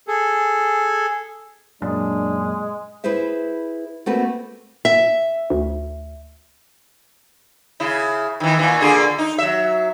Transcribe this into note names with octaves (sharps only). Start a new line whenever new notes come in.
G#4 A4
F#2 A#2 G#3 D4
E4 G#4 B4 C5 E5
A3 A#3 C4 F#4 A4 B4
E5
D2
C#3 E4
D#3 E3
A#2 E3
A#2 D3 G#4
D#4
F#3 E5